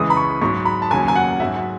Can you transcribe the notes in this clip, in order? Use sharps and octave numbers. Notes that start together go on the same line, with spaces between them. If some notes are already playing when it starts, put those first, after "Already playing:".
Already playing: C#2 C#3 E3 G#3 D#6
B5
C#6
G#2 F#3 C#6
B5
A5
D#2 C#3 F#3 G#5
G#5
F#5
G#2 F#3 E5